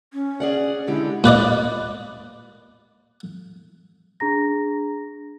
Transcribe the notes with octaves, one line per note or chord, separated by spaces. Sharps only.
C#4
G#4 D5 F#5
D3 G#3 E4 G4
A#2 B4 D5 D#5
D4 G#4 A#5 A#6